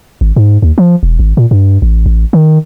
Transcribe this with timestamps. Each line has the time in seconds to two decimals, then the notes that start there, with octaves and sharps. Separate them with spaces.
0.21 G#1
0.36 G#2
0.62 D#2
0.78 F3
1.03 E1
1.19 G#1
1.37 A#2
1.51 G2
1.82 A1
2.06 A1
2.33 D#3